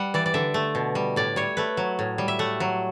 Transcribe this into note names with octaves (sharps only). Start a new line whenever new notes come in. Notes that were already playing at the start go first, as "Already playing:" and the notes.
Already playing: G3 F#5
E3 D5
D5
D3 E5
A3
B2
G3
A2 D5
G3 C#5
A3 B4
F#3
A2
G3
E5
A3 F#5
F#3